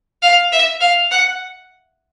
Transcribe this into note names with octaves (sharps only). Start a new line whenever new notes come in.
F5
E5
F5
F#5